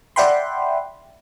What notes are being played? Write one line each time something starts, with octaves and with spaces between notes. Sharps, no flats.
D5 E5 F#5 G5 B5 C6